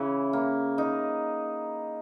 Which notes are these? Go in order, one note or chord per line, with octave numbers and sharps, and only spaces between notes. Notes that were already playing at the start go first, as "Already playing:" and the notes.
Already playing: C#3 E3
A#3
D#4